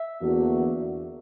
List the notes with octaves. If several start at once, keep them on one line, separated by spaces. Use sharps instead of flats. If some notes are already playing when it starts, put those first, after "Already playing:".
Already playing: E5
E2 D3 A#3 D4 F#4